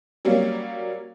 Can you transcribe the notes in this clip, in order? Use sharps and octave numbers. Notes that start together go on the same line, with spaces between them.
F#3 G3 A#3 C#4